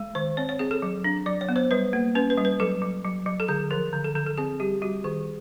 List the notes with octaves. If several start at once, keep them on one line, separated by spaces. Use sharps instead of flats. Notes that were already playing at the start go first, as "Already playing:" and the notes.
Already playing: G#3
D#3 C5
C4 C#5
C#5
C4 G#4
A4
F#3
D4
F#3 D5
C#5
B3
C5
G3 B4
A#3
C#4 B4
B4
G3
B4
F#3 A4
F#3
F#3
F#3
A4
D3 G#4
F3 A#4
D3
A4
D3 A4
A4
C4 G#4
G3 G4
G3 F#4
D#3 G#4